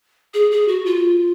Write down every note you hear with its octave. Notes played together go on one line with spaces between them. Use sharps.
G#4
G#4
F#4
F4